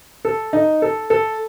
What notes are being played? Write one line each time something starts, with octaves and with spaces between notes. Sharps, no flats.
A4
D#4
A4
A4